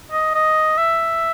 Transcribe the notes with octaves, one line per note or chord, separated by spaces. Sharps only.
D#5
D#5
E5